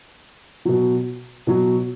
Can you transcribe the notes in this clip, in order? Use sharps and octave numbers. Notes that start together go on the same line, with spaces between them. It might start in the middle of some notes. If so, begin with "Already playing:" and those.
B2 F#3
B2 F#3